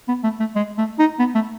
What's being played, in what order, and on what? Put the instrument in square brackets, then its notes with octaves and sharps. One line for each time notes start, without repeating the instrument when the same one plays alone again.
[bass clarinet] B3
A3
A3
G#3
A3
D#4
B3
A3